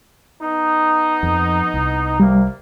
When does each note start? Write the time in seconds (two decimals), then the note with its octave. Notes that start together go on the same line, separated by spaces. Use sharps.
0.42 B3 D#4
1.23 F2
1.74 C2
2.20 C3 G3 A#3